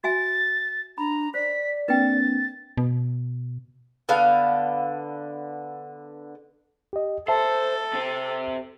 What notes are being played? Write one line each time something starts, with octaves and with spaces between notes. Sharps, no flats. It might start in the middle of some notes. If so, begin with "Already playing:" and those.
F#4 E5 G#5 A6
D4 A#5 B5
C5 D5 B6
A#3 C4 D4 B4 G5 A6
B2
D3 B3 F5
G4 D#5
A4 C5 E5 A5
C3 C4